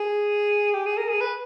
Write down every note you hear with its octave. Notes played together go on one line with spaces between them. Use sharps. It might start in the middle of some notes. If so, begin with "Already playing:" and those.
Already playing: G#4
G4
G#4
A#4
G#4
B4